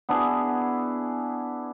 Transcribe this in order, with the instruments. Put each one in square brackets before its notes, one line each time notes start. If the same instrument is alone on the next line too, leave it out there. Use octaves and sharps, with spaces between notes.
[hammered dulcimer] B3 D4 E4 G#4